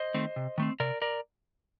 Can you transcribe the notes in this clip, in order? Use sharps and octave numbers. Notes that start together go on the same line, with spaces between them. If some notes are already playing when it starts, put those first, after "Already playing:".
Already playing: C5 D#5
D#3 A3 C4
C3
D#3 A3 C4
C3 A#4 D5
A#4 D5